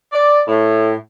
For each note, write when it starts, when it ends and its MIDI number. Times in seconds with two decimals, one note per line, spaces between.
0.12 0.41 74
0.48 0.94 45